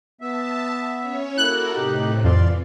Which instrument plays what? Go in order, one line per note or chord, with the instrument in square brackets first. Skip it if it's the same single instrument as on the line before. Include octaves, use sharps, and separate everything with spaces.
[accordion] B3 E5 [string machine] A5
[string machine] C#4 C#5
[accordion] A#3 E4 [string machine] F#4 A4 A#4 [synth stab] F#6
[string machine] A2 C3 [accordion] D#4 G4
[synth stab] F2 [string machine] E3 [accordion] D5 F5 C6